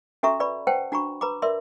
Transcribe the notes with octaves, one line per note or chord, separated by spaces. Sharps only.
C#4 F#4 A4 E5 A#5 C#6
B4 D5 B5 C#6
B4 C5 F#5 G5 A5
D4 F#4 A#5 B5 C#6
B4 A#5 B5 D6
A#4 B4 D5 E5 C6